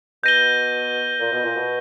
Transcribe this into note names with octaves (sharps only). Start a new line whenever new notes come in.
B2 G6 A#6 D#7 G7
A#2
B2
A#2
B2